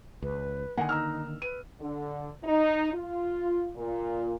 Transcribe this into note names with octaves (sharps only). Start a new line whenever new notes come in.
C#2 B4
D3 D#3 A#3 F#5 G#5
D#4 A#5 E6 F6
B4 D#7
D3
D#4
F4
A#2